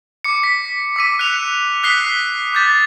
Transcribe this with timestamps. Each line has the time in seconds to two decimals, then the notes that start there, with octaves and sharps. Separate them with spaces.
0.24 D6 C#7
0.44 B6
0.96 D6 E6 B6 D#7
1.19 F#6 C#7 F7
1.83 D#6 F#6 B6 C7 G7
2.53 D6 G6 A6 B6